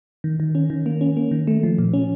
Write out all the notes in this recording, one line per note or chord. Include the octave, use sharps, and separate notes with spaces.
D#3
D#3
C#4
D#3
A#3
C#4
A#3
D#3
A3
F3
A#2
C#4